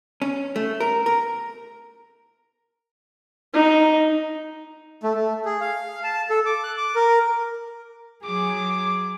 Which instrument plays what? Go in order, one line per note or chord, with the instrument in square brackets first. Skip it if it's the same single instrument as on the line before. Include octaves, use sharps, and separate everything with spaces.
[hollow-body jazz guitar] C#4
A3
A#4
A#4
[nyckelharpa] D#4
[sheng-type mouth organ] A3
A3
G#4
F5
A5
A4
D6
F#6
D6
A#4
[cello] F#3 G#4 [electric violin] D6